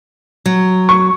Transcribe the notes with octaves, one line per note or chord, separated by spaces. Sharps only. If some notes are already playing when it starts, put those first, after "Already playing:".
F#3
C#6